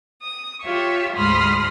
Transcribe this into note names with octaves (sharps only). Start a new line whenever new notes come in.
D#6
F4 G4 C#5 E5 C#6
D2 G#2 B5 C6 D#6 F6